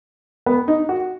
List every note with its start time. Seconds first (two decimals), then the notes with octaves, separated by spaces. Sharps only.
0.46 B3
0.68 D#4
0.89 F#4